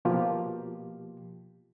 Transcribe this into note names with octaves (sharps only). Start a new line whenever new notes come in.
B2 F3 A#3 F4 G4